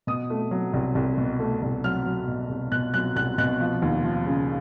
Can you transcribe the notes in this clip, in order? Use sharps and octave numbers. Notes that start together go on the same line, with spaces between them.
B2 D#6
A3
F#3
C2
C2
B2
A3
C2
F#3 F6
F#3
B2
C2
B2 F#6
F#3 F#6
C2 F#6
B2 F#6
F3
D#2
F3
C#3